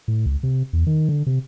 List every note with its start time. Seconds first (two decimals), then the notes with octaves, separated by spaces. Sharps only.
0.08 A2
0.26 C#2
0.43 C3
0.73 E2
0.87 D#3
1.09 D3
1.26 C3